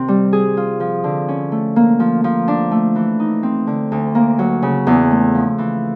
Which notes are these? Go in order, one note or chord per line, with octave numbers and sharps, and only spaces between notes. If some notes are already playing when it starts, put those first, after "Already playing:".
Already playing: C3 D#3 C4
G3
G#4
F4
F3
D3
C#4
A3
A#3
F3
F3
D4
A3
E3
D#4
C4
D3
D2
A#3
F#3
C#3
E2
A3
F3
E3